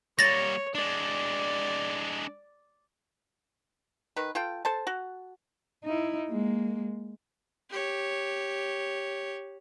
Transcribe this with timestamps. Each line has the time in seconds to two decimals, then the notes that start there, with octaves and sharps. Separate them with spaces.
0.19 G3 A#3 C#5 A6 A#6
0.75 G#3 D4 D5
4.16 D#3 B4
4.35 F4 A4 G5
4.65 A4 C5 A5
4.87 F#4
5.84 D#4 E4
6.28 G#3 A#3
7.70 G4 C#5